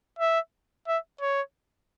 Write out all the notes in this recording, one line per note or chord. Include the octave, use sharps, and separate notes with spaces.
E5
E5
C#5